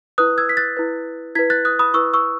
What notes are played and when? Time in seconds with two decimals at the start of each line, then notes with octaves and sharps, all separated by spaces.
0.18 E4 B4 D#6 F#6
0.38 E6 G#6
0.49 B6
0.57 F#6 A6
0.77 E4 B4
1.35 E4 B4 G#6 B6
1.50 F#6 A6
1.65 D#6 F#6
1.79 B5 D#6
1.94 E4 B4 C#6 E6
2.14 C#6 E6